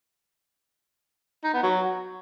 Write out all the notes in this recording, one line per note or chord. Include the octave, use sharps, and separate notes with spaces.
D#4
B3
F#3